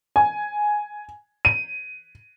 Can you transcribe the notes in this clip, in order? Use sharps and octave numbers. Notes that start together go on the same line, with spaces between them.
G#5
D#7